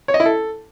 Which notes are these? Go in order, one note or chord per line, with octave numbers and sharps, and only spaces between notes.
C#5
D#5
E4
A4